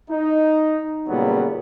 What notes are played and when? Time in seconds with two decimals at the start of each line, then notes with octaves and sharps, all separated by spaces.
0.10 D#4
1.08 A#2 C#3 F#3 G3 B3